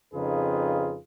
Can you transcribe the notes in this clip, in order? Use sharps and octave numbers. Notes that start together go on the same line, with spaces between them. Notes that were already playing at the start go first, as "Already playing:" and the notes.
F2 C#3 D#4 F4 G#4 B4